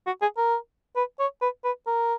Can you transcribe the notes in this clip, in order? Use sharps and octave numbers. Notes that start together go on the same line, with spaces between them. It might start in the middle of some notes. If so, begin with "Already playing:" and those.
F#4
G#4
A#4
B4
C#5
B4
B4
A#4